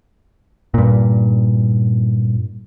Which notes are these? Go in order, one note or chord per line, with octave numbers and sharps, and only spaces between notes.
G2 A#2